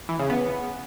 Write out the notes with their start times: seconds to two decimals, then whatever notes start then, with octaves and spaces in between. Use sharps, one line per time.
0.09 E3
0.19 C#3
0.30 B3